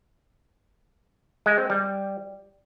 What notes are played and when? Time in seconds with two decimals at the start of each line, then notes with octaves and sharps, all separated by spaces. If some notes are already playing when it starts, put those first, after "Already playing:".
1.46 G#3
1.58 C4
1.70 G3